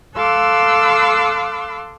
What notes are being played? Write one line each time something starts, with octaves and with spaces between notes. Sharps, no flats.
A4 F5 C6 D6 E6 F#6